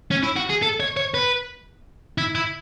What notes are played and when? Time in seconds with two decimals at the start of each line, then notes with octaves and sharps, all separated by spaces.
0.11 C#4
0.23 E4
0.36 F#4
0.50 G#4
0.62 A4
0.80 C#5
0.97 C#5
1.14 B4
2.18 E4
2.35 E4